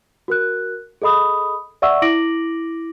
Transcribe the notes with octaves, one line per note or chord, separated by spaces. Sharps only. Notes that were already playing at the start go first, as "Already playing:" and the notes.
F#4 A#4 F#6
G#4 A4 D#5 B5 D#6
D5 E5 F#5 C#6 E6
E4 D6 A#6 D7 F#7